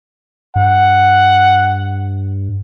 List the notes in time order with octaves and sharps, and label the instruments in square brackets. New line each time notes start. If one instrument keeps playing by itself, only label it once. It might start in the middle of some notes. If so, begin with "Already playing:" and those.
[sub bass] G2 [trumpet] F#5